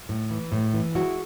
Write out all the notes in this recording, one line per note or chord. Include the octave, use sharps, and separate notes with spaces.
A2
E3
A2
E3
G#3 E4 F#4